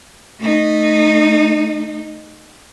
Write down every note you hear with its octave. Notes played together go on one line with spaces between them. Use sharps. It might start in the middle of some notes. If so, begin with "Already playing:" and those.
A3 D#4